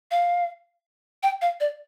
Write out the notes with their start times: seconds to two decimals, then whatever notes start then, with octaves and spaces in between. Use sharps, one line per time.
0.11 F5
1.23 G5
1.42 F5
1.60 D5